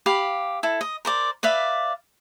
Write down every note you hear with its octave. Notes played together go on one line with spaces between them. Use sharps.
G4 F5 B5
E4 A4
D#5
A#4 C5 D5
B4 D5 E5 F5